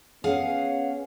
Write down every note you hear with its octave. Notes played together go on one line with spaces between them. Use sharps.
B3 C#4 G#4 F5 F#5